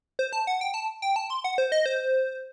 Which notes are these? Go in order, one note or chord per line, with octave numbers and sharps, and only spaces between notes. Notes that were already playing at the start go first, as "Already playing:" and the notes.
C5
A5
F#5
G5
A5
G5
A5
C6
F#5
C5
D#5
C5